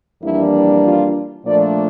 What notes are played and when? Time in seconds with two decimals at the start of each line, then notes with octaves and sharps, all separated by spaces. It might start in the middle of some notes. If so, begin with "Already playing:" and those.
0.22 F2 E3 G3 A#3 D4 E4
0.85 F4
1.46 A#2 F3 A3 D4 D5